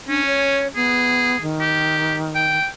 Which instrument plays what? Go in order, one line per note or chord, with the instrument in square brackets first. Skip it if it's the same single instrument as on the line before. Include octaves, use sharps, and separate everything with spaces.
[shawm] C#4 [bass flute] D4
[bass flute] C#5
[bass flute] B3 [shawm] G#4
[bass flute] D#3
[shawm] G4
G5